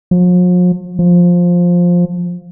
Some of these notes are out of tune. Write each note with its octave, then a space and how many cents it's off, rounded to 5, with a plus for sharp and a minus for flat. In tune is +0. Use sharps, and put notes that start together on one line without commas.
F3 +45
F3 +10